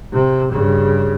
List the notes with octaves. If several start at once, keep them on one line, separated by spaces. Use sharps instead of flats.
C3
G2 C#3